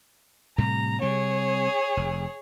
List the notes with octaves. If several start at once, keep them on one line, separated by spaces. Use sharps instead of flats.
A2 C3 G3 A#5
C3 G3 C4 G#4 C#5
F1